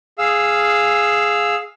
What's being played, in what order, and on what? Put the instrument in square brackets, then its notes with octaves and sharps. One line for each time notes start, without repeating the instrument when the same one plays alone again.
[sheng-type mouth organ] G#4 F5 E6